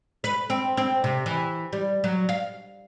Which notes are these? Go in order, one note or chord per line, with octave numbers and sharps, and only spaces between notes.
B4
C4
C4
C3
E3
G3
F#3
F5